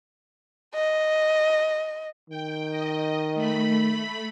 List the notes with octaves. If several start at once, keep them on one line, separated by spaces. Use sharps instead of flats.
D#5
D#3 G5
D#5
A3 B5